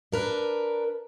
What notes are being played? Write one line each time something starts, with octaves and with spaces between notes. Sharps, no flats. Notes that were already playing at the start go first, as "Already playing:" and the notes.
D4 A#4 B4